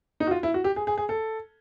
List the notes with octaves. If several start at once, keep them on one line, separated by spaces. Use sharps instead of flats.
D#4
F#4
F4
E4
F#4
G4
G#4
G#4
G#4
A4